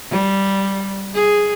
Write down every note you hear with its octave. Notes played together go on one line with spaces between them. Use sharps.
G3
G#4